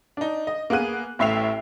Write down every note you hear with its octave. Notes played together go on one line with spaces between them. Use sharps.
D4 D#4
D#5
A#3 B3 G#4 F#6 D#7
A1 A2 E5 C7 F7